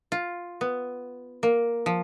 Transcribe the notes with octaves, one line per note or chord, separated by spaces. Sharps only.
F4
B3
A#3
F3